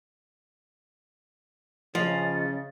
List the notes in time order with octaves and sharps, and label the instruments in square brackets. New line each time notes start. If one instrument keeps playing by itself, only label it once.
[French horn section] C#3 [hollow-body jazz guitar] F3 [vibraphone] D#5 [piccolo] A6